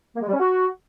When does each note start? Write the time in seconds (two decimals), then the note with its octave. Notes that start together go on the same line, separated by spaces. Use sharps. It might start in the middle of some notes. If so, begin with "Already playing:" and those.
0.16 A#3
0.22 G#3
0.28 G3
0.34 C#4
0.40 F#4